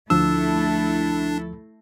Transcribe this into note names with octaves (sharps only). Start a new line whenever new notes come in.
D2 F3 A3 D4 E4 A4 E6